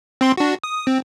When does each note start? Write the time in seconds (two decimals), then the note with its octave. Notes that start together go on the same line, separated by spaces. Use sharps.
0.21 C4 C6
0.37 D4 F#4
0.64 D#6
0.87 C4